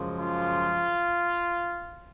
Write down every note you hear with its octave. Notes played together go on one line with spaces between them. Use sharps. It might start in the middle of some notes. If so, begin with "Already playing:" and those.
Already playing: F#2 C#3 F3 G#3
F4